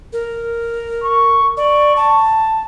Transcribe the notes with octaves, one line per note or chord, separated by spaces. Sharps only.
A#4
C#6
D5 C#6
A5